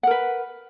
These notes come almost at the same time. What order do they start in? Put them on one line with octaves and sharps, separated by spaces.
F#5 A#4 B4